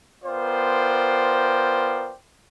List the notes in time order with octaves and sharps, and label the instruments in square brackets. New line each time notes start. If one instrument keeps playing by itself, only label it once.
[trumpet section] B3 F4 A#4 C5 D5 G5